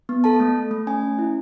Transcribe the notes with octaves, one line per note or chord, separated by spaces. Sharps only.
B3
A4 A5
A3
A3
A3
C#4 G#5
C#4
E4